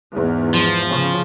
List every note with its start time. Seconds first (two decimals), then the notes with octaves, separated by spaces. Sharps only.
0.12 E2 G#2
0.54 F3
0.90 C#3